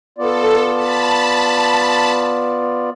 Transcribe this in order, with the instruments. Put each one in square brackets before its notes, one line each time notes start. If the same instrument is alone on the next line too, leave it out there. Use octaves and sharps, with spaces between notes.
[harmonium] B3 F4 D5 [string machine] A4
[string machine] A5 B5